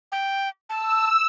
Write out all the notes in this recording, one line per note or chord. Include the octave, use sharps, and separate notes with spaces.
G5
A5 E6